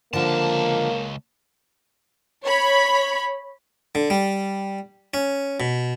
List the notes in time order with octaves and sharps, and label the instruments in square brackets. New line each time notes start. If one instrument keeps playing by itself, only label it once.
[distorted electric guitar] C#2 A5 [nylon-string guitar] D3 F3 [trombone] A#3
[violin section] C#5 B5
[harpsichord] D3
G3
C#4
B2